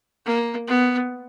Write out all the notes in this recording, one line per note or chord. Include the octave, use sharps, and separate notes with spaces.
A#3
B3